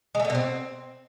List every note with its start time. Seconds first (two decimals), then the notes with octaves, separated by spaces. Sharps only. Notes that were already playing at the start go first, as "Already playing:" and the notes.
0.15 G#3
0.20 A3
0.25 D3
0.30 B2
0.35 C4